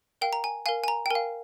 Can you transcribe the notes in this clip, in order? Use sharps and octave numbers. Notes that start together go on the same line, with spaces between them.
A#4 F5 G5
A#5
G#5
A#4 F5 G#5
G#5
A#5
G5
A#4 F5 G#5